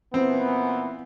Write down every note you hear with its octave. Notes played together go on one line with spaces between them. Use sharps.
A#2 E3 B3 C4